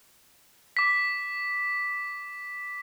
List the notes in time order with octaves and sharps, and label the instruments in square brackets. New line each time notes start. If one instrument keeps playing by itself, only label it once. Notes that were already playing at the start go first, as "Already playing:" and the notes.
[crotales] D6 B6